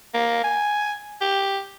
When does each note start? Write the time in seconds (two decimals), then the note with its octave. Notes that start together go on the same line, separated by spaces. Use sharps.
0.14 A#3
0.44 G#5
1.21 G4